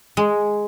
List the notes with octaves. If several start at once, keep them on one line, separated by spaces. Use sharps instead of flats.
G#3